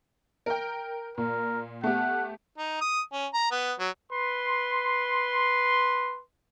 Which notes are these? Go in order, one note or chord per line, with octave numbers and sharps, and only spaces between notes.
A#4 G5
A#2 A#4
A3 B3 G4 F#5
D#4
D#6
C#4
A#5
B3
F#3
B4 C6